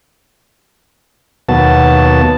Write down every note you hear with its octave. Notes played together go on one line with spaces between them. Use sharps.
D#2 B2 F#3 B3 A5